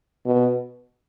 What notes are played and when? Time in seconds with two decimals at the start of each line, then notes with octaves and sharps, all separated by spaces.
0.25 B2